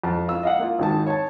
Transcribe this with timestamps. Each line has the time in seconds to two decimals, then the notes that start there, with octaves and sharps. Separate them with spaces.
0.04 F2 A5
0.28 F4 E6
0.43 D#5 F5 F#5
0.59 A#3 F4
0.79 G#1 D#3 A5
1.07 C#5 A5